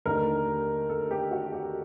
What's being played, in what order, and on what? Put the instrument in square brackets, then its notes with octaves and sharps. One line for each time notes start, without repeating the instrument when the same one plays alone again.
[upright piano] D#2 D3 A3 D#4 A#4
A4
G4
F#4
G4